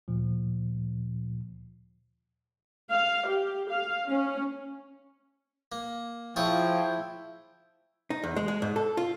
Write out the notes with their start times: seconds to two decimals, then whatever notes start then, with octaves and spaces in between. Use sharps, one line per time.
0.08 D2 A#2 F3
2.91 F5
3.27 G4
3.70 F5
4.09 C#4
5.72 A#3
6.36 F3 E4 F4 G#4 C#5 G5
8.10 D#4
8.24 E2
8.36 G#3
8.48 G#3
8.62 G#2
8.76 A4
8.97 F4